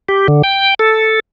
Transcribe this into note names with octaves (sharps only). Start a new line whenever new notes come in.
G4
D3
G5
A4